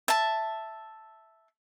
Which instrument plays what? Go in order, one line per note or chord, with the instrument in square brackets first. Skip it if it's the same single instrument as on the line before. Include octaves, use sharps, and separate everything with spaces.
[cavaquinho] E5 A5